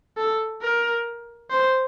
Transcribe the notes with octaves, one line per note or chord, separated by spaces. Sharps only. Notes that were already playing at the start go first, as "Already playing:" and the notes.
A4
A#4
C5